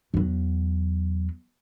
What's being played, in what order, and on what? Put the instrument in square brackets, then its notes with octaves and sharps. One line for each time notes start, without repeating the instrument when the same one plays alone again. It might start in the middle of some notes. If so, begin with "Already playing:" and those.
[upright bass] E2 F#3